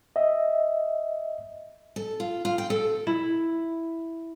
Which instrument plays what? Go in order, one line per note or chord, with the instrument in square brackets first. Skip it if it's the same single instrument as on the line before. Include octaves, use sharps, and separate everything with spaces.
[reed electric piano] D#5 E5
[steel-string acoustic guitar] A4
F4
F4
G5
A4
[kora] E4